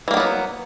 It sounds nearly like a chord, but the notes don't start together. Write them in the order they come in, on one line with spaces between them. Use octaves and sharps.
E3 A#3 D#3 B3 F#3